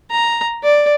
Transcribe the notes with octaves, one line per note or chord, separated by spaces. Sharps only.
A#5
D5